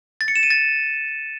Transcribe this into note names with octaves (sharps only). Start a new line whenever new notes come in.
A6
C#7
E7
D#7
A6